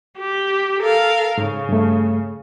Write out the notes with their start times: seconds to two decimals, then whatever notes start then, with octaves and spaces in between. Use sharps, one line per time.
0.17 G4
0.81 A4 A#4 F5
1.38 G#2 C#3
1.69 G2 A3